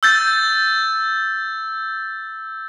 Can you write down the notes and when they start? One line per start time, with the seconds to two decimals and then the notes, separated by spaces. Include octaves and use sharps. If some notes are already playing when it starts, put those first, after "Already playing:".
0.03 E6 G6 A6